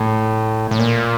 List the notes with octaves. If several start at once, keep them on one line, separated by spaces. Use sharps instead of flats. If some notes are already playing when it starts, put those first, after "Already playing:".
Already playing: A2
A2
A#2